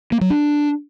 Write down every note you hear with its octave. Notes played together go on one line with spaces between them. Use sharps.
A#3
F#3
D4